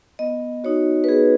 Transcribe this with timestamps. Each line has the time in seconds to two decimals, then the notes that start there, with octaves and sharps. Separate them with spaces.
0.19 B3 D#5
0.64 D#4 F#4 C#5
1.04 B4
1.08 B3 G#4